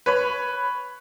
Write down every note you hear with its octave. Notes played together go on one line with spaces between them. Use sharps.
B4 C#5 B5